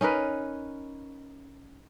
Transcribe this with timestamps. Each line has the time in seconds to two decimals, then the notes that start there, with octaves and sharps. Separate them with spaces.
0.01 C#4 D#4 A#4 B4